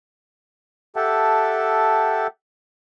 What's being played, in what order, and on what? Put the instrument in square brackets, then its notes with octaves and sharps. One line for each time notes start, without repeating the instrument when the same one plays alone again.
[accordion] G4 A4 E5 F#5 G5 A5